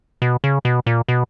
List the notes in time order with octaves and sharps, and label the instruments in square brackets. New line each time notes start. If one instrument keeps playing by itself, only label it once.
[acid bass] B2
C#3
B2
A#2
B2